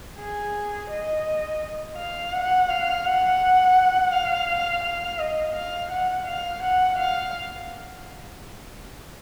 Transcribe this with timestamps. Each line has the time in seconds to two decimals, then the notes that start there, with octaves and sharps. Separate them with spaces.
0.18 G#4
0.90 D#5
1.97 F5
2.33 F#5
2.69 F5
3.05 F#5
4.12 F5
4.83 F5
5.19 D#5
5.55 F5
5.91 F#5
6.27 F5
6.62 F#5
6.98 F5